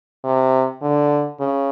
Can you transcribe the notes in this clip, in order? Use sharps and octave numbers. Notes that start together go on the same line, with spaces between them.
C3
D3
C#3